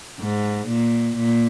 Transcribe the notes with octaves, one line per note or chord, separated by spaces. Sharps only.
G#2
A#2
A#2